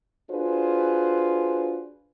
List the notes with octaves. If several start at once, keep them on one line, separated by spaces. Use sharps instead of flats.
D4 F4 F#4 G#4 B4 C5